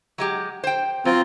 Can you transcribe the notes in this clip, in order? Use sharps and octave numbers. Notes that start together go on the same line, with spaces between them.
F#3 G#3 G4
C5 G5
F#3 C4 F4